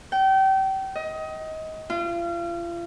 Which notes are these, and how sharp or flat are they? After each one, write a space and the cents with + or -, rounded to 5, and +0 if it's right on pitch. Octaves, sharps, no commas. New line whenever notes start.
G5 -30
D#5 +25
F4 -35